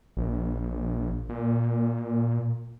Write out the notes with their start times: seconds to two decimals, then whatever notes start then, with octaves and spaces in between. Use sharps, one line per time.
0.17 A#1
1.29 A#2